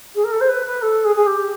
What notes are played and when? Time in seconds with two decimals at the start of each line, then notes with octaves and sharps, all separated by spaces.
0.15 G#4
0.24 A#4
0.31 A4
0.40 C5
0.48 B4
0.66 B4
0.82 A4
1.05 G#4
1.16 G#4
1.26 G4